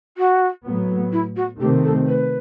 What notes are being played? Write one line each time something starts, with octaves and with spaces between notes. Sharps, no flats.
F#4
A2 F#3 B3
E4
F#4
C3 D#3 A3 C4 G4
A4
B4